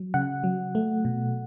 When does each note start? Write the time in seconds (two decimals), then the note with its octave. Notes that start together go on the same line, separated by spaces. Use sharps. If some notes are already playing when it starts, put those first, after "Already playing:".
Already playing: F#3
0.14 C#3 F#5
0.44 F#3
0.75 A3
1.05 B2